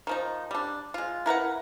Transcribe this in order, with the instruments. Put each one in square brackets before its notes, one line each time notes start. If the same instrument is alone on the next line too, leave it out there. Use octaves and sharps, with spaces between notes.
[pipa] D#3 F3 D#4
G3 D4
G#3 F4
E4 A#4 B4 F#5